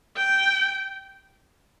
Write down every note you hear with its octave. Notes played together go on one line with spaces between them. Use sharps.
G5